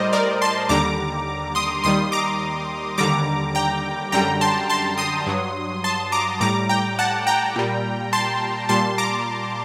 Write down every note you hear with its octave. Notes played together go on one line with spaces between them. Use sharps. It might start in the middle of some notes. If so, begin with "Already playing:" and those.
Already playing: A2 G3 A#4 C5 D5 D#5
A#4 D5
A5 C6
D#2 D3 G3 A#5 D6
C6 D#6
D#2 D#3 G3 C6 D#6
A#5 D6
D#2 D3 G3 A#5 D6
G5 A#5
F#2 D3 G3 G5 A#5
A5 C6
A5 C6
C6 D#6
G2 F#3
A5 C6
A#5 D6
A2 G3 A#5 D6
G5 A#5
F#5 A5
G5 A#5
A#2 G3
A5 C6
A#2 G3 A5 C6
A#5 D6